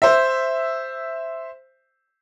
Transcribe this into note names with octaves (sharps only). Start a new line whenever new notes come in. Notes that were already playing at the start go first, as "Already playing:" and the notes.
C5 E5